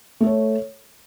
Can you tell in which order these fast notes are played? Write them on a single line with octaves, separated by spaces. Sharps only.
A3 A4 C#5